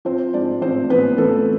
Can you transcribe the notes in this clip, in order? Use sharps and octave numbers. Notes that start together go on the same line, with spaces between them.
F3 C4 C5
G#2 D4 D5
A1 C4 C5
A1 B3 B4
A1 A3 A4